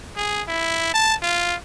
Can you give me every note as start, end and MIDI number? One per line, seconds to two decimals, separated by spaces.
0.16 0.42 68
0.48 0.90 64
0.94 1.14 81
1.22 1.55 65